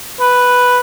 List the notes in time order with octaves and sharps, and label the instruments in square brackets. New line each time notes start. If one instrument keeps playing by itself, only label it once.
[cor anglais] B4